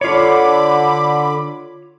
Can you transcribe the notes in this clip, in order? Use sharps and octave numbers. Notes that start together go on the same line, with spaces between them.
D3 F4 C#5 B5 D6